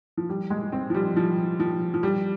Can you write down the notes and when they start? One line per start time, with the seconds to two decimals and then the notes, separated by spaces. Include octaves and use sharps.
0.17 F3
0.29 G3
0.50 G#3
0.72 C4
0.90 F3
0.94 G3
1.16 F3
1.60 F3
1.94 F3
2.03 G3